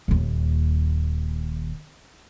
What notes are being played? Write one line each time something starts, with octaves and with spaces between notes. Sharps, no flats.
D#1 D#2